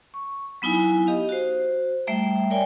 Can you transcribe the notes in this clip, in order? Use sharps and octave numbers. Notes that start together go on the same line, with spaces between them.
C#6
F#3 B3 D#4 E4 G#5 D#6
G4 D#5 F5
F#4 C5
G3 A3 E5 G5 A#5
A#4 C#5 D5 G5 G#5